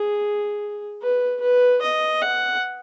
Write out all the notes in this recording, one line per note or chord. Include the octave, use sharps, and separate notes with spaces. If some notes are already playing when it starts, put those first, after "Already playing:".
Already playing: G#4
B4
B4
D#5
F#5